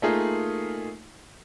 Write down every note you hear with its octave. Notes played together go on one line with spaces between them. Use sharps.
A3 A#3 D#4 F4 G#4